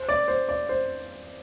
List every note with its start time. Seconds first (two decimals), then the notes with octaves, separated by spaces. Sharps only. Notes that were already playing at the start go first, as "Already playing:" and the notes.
Already playing: C5
0.09 D5
0.28 C5
0.49 D5
0.69 C5